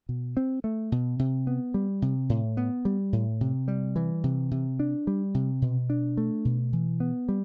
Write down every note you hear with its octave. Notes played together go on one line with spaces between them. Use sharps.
B2
C4
A3
B2
C3
B3
G3
C3
A2
B3
G3
A2
C3
G3
E3
C3
C3
D4
G3
C3
B2
D4
A3
B2
E3
B3
G3